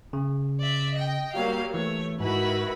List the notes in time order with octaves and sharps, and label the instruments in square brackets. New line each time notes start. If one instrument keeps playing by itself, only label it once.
[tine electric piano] C#3
[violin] D5 E5
D#5 G5
[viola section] F#3 G3 A#3 [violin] F5
[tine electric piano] E3 [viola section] A3 [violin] C#5
[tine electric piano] G#2 [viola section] D#3 E4 F#4 [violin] B4 B5